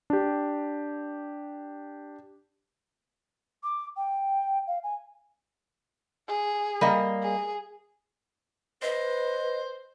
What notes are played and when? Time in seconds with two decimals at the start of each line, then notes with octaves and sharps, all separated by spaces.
0.10 D4 G4
3.63 D6
3.97 G5
4.67 F5
4.83 G#5
6.28 G#4
6.81 G3 A#3 D#5
7.22 G#4
8.82 B4 C5 D#5